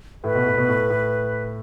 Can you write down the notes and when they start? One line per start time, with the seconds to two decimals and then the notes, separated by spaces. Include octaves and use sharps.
0.24 A2 B4
0.35 B2
0.46 A2
0.57 B2
0.68 A2
0.90 A2